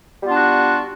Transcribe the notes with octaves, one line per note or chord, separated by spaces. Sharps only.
G3 B3 D4 F4 F#4